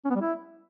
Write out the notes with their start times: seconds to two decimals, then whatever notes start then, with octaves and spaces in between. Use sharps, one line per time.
0.05 C#4
0.10 B3
0.16 G3
0.21 E4